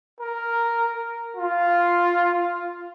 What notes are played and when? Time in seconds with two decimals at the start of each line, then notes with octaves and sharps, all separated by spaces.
0.20 A#4
1.37 F4